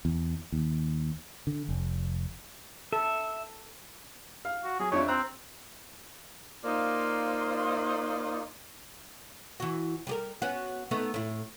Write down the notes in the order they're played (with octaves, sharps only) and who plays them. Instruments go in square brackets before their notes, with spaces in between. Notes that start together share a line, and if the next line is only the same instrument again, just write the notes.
[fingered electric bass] E2
D#2
D3
F1
[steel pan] A4 [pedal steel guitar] E5
[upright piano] F5 F6
[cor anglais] F#4
[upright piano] F#3 [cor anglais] G#4
[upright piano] F2 D4 E5 [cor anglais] C#5
[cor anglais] C4 [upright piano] A#5 E6 F#6
[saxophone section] A#3 D#4 F4 C5 D5
[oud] E3 F#4
G3 G4 A#4
B3 C#4 F#4
A3 B3 D#4
A2 E4